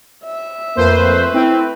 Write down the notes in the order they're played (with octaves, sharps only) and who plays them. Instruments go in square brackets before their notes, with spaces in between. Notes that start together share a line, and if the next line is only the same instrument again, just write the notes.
[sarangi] E5
[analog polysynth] F2 C5 [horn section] A3 B4 [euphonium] A#3
[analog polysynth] C4 [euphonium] E4